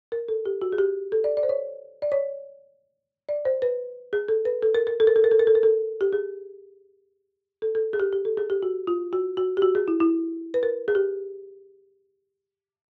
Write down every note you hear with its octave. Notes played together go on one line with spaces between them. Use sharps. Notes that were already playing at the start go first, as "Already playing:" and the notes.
A#4
A4
G4
F#4
G#4
G4
A4
D5
D5
C5
C#5
D5
C#5
D5
C5
B4
G#4
A4
B4
A4
A#4
A#4
A4
A#4
A4
A#4
A4
A#4
A4
A#4
A4
G4
G#4
A4
A4
G#4
G4
G4
A4
G#4
G4
F#4
F4
F#4
F#4
G4
F#4
G#4
E4
E4
B4
A#4
G#4
G4